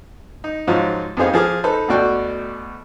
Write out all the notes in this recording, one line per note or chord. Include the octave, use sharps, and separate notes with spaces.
D#4
G#2 F3 F#3 D#4 F4
F2 B3 D#4 G#4 C5 F5
F3 G#4 D6 F6
D#4 A4 B4 C5
D2 B2 A3 F#4 D5 G5